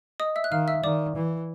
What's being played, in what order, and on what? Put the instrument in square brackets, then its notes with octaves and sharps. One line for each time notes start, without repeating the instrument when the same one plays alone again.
[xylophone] D#5 D#6
E5 E6
F#6
[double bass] D#3 [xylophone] F5 F6
[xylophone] E5 E6
[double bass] D#3 [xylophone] D5 D6
[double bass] E3